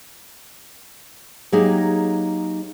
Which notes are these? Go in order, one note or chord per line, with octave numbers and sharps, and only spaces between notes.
F#3 A#3 D#4 G4 G#4